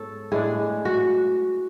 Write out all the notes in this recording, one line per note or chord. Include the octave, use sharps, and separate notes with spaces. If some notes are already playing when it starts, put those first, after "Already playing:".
Already playing: G#2 B3 A4 C#5
A2 G#3 D4 G#4
F#4